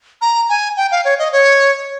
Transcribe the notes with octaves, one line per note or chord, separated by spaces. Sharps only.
A#5
G#5
G5
F5
C#5
D#5
C#5